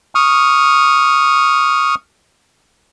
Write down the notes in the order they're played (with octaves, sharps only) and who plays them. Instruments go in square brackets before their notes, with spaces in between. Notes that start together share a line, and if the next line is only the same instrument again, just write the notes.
[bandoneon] C#6 D#6 F6